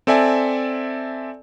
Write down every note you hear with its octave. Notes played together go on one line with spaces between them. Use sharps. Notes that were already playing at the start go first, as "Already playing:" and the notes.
C4 A4 D5 E5 G#5 A5